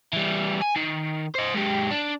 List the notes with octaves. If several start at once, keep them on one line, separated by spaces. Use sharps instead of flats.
E3 G3
G#5
D#3
C5 D#5
G#2 G4
D4